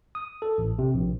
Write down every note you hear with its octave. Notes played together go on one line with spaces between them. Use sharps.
D#6
A4
A1
C3
A#1